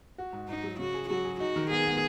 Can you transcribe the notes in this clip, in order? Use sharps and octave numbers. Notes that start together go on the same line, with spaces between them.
F#4
G#2
G#2 D#4
F#3
C#3 F#4
G#4
F#3 F#4
G#4
D#4 F#4
D#3
B3 G#4
B3